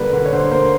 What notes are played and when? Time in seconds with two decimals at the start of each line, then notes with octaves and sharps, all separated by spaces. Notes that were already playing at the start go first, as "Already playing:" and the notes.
Already playing: D3 G3 A#3 B4
0.13 D3
0.26 C#5
0.33 D3 C5
0.51 A#3 C5